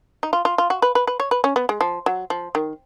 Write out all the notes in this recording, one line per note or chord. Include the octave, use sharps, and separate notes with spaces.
D#4
F4
F4
F4
F#4
B4
B4
B4
C#5
B4
C#4
B3
G#3
F3
F#3
F3
D#3